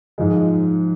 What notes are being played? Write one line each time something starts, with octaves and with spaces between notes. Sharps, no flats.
G#2 F3 G#3